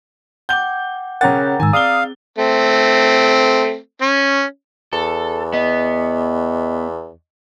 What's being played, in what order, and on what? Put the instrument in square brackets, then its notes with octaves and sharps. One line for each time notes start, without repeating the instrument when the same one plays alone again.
[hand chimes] F#5 G5 D6 [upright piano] G6 G7
[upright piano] C#3 C#4 A6 [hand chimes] A#4 D6 [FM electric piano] F#5 G5 A#5
[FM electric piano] G#2 D#3 [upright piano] G#5 [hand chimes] A#5 E6
[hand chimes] C4 G#4 [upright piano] D5 G7 [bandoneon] F5 [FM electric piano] D#6
[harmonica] A3 C4
C#4
[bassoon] E2 [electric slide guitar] A4
[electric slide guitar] B3 [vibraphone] D#5